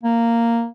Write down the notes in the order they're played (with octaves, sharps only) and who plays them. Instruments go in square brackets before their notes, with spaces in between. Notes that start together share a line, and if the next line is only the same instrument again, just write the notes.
[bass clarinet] A#3